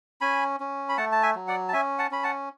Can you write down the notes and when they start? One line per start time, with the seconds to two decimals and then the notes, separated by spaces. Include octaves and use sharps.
0.21 C#4 G#5 B5
0.60 C#4
0.89 B5
0.97 A3 F#5 A5
1.12 A5
1.22 E5 G#5
1.35 F#3
1.48 D5 F#5
1.68 A5
1.73 C#4 E5 G#5
1.98 F#5 A5
2.11 C#4 B5
2.23 F#5 A5